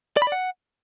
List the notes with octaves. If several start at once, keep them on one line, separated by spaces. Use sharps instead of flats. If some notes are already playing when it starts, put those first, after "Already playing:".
D5
B5
D5
F#5